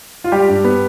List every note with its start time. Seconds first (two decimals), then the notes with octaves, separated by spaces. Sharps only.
0.24 F4
0.32 G3 G4
0.49 G2
0.64 B3